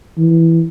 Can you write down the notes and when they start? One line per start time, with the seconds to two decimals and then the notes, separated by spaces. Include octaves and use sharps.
0.18 E3